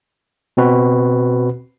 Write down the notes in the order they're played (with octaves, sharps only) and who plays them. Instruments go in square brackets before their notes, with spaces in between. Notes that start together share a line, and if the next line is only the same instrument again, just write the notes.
[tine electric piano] B2 C4 F#4 B4